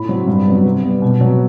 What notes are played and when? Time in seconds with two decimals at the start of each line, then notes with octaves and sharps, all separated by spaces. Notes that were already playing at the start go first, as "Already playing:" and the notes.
Already playing: A2 B5
0.09 F#3 C4
0.27 G2
0.46 F#3 B3
0.65 C3
0.83 G3 B3
1.02 B2
1.21 F#3 B3